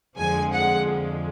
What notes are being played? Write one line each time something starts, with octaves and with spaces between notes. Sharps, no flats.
F2 D3 F3 G#3 G#5
F#5